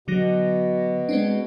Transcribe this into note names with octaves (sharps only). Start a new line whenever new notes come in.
B2 D3 F#3 A#6
G#3 C4 D4